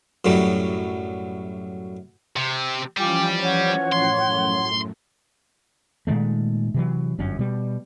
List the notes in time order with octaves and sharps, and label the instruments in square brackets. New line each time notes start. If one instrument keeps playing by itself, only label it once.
[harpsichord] F#2 A2 F#3 G3
[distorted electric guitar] C3
[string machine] E3 F3 C#4 [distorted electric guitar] G3 [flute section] F4 G4 G#5
[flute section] C#5 F#5 C#6
[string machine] F#2 A2 [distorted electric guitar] C6
[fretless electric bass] A#2 D#3 G#3 A3
C3 E3 F#3
G1 F#2 C#4
B2 G3